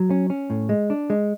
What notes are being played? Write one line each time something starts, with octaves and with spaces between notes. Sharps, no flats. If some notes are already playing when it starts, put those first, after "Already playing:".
Already playing: F#3
C#4
C#4
A2
G#3
D4
G#3